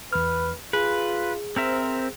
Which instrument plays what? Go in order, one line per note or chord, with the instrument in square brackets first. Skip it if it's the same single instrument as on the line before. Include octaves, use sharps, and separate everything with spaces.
[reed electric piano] E2 F6 [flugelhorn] B4
[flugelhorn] F4 [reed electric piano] G#4 [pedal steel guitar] B4
[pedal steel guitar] C4 A#4 E5 [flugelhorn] C5